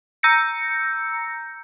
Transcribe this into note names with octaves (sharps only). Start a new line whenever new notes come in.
A#5 E6 G6 A#6 C#7